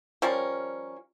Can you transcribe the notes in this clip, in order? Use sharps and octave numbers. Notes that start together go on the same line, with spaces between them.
F3 G3 C#4 A#4